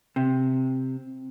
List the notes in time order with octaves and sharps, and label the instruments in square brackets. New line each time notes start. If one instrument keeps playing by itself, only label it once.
[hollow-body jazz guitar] C3